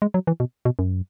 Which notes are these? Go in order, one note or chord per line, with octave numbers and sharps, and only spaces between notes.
G#3
F#3
E3
B2
B2
F#2